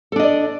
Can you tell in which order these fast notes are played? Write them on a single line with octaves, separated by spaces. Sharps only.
A4 D4 D#5 D5